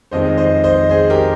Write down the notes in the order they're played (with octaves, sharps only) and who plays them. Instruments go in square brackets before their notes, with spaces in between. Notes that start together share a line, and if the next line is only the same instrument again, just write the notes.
[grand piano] F2 D#3 G#3 C5 D#5
C5 D#5
C5 D#5
G#4 C5
G4 A#4